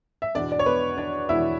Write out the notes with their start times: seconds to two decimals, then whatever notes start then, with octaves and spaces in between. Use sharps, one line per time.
0.22 E5
0.35 E2 B2 D4 D5
0.52 D5
0.59 C#5
0.66 B3 B4
0.98 D4 D5
1.28 E2 B2 E4 E5